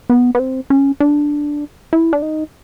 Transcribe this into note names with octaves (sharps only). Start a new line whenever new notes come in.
B3
B3
C4
C#4
D4
E4
D4
D#4